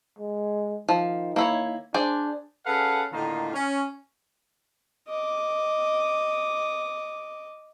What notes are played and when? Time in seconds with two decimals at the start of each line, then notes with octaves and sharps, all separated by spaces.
0.19 G#3
0.89 D#3 F3
1.36 A#3 E4 C#5
1.94 D4 G#4 C5 D5
2.66 C#4 G#4 A4 B4 F5 F#5
3.13 A2 D3 D#3 A#3 D#4 F4
3.54 C#4
5.08 D#5 D6